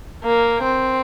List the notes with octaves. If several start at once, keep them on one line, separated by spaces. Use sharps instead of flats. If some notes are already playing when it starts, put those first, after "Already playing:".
A#3
C4